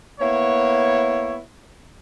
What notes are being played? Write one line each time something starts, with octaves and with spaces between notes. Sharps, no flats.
A#3 B3 E4 C#5